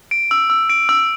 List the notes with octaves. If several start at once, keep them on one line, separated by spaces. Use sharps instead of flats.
D7
E6
E6
D7
E6